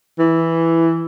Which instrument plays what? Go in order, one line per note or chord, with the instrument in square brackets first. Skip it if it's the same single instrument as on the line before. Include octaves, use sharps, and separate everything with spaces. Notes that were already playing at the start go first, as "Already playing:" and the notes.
[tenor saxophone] E3